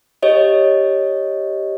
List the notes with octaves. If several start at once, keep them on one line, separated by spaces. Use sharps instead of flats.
G4 C#5 D#5